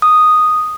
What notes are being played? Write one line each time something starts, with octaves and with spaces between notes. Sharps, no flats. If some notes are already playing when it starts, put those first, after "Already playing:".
D#6